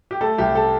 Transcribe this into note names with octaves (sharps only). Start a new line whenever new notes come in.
G4
A3 A4
C2 G4
A4